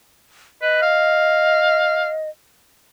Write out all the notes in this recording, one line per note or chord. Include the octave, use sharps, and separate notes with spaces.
B4 D#5
F5